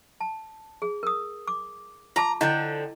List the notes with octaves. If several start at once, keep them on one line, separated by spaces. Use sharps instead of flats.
A5
G#4
A#4 D#6
D6
F4 A5 A#5 D6
D3 F3 E4 D#5 G5